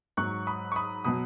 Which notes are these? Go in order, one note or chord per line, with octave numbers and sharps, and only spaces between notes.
G#2 F#3 C#6 F#6
B5 D#6
C#6
B5 D#6
B2 F#3 B5 D#6